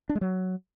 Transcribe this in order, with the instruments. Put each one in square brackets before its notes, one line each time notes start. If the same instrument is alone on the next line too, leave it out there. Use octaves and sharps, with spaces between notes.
[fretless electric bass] D4
G#3
F#3